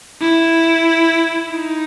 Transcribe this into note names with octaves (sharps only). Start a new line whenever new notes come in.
E4
D#4